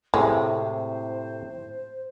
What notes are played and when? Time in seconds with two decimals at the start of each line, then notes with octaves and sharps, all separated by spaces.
0.14 A2 C3 G#3 C5